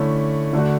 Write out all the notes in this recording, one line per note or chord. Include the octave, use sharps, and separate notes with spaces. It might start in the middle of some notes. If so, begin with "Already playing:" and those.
Already playing: D3 A3 C#4 E4
D3 A3 D4 F#4